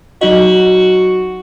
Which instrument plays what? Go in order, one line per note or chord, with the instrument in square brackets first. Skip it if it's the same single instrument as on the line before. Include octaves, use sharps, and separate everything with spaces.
[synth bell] F#3 D#4 D#5 [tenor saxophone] F#4